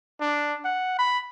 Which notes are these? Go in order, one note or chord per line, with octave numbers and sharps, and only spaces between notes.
D4
F#5
B5